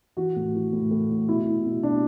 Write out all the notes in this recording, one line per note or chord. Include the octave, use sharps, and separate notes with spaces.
E3 F#4
A2
E3
A2
A2
A2
B2 E4
B2
B2
B2 D4